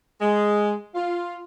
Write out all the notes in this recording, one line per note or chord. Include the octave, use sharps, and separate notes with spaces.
G#3
F4